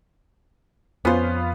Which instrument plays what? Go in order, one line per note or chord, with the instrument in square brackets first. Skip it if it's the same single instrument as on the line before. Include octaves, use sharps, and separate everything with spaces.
[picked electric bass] F2 [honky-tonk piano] B3 F4 [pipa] C#4 C5